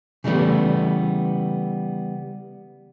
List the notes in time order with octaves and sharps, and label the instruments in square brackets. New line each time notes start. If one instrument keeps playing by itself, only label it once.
[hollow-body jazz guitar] C#3 E3 G3 A3 B3